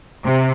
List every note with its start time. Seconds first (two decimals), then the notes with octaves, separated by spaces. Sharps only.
0.25 C3